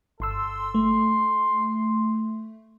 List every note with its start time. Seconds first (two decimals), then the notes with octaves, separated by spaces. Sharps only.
0.20 G1 A4 C6 E6
0.75 A3 C6